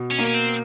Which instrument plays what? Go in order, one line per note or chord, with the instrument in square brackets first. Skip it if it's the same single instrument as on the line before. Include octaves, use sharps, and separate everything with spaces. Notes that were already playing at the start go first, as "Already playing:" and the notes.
Already playing: [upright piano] B2
[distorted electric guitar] C#4
[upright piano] A#3
[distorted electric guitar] C#4
C4